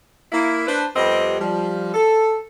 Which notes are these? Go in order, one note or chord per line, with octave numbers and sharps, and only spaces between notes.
A#3 E4
D4 B4 C5
F2 G3 B3 C4 G4 D#5
F3 G3
A4